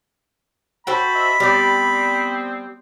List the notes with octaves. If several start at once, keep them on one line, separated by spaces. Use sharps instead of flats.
F#4 A4 C5 B5
D#5 E5
G3 B3 C4 D5